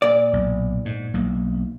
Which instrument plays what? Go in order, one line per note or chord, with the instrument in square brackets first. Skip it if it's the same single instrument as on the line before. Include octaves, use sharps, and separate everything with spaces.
[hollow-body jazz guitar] A#2 D5
[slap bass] B1
G#2
B1 A#3